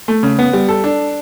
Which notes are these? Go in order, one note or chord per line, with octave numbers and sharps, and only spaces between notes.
A3
C#3
B3
G3
A4
D4